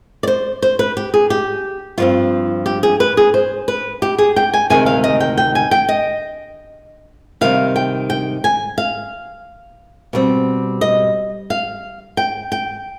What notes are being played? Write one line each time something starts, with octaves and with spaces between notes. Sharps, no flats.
D5
C5
C5
B4
G4
G#4
G4
G2 F3 C4 F4
G4
G#4
B4
G#4
C5
B4
G4
G#4
G5
G#5
D2 C3 D#3 G#3 G#5
F5
D#5
G5
G5
G#5
G5
D#5
C3 D#3 G3 F5
G5
G5
G#5
F5
B2 G3 C4
D#5
F5
G5
G5